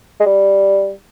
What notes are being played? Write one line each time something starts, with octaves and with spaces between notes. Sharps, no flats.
G#3
G3